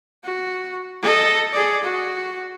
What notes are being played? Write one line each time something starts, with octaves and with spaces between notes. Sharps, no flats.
F#4
A4 D#5
G#4 D5
F#4